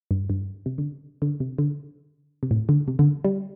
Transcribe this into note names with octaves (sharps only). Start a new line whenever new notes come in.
G2
G2
C3
D3
D3
C3
D3
C3
A2
D3
C3
D3
G3